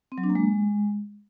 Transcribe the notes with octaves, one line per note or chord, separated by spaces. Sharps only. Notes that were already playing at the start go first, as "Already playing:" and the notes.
C4
F#3
D4
A#3
G#3